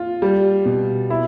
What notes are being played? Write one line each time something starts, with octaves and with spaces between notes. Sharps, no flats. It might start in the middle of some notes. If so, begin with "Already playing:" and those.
Already playing: F4
G3
B2
E4